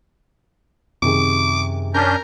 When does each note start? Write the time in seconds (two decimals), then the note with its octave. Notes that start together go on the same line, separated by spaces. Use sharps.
1.02 F#2 C3 D#3 G#4 D6
1.94 C#4 D4 A#4 G6